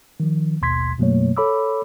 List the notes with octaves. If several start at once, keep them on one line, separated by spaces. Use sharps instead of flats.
D#3 F3
A1 D#2 B2 C6 G#6 B6
F#2 B2 F#3 A3 A#3 C#5
A4 C#5 B5 D6 E6